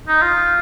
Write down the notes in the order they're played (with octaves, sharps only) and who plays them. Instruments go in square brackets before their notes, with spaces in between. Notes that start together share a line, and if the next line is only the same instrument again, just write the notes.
[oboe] D#4
F4